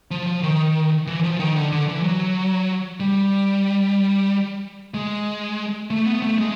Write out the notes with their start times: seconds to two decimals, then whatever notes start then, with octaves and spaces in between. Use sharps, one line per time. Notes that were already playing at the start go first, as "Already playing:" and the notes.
0.11 F3
0.27 F3
0.43 D#3
1.07 E3
1.24 F3
1.40 D#3
1.56 D3
1.72 D3
1.88 E3
2.03 F#3
3.00 G3
4.94 G#3
5.90 A3
6.06 B3
6.22 A3
6.38 G#3